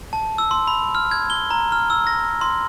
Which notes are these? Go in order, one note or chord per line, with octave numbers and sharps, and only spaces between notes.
A5
E6
C6
B5
F6
G#6
G7
A#5
F6
E6
A#6
C6